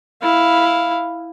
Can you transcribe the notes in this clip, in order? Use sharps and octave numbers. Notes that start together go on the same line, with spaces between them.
E4 F5